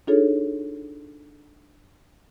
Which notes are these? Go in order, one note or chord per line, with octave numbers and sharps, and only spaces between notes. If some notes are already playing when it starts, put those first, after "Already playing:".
D4 D#4 F4 G#4 A4 C#5